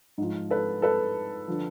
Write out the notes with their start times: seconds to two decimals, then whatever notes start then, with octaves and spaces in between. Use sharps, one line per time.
0.18 G#2 F3
0.50 A4 B4
0.82 A4 B4
1.48 D3 F3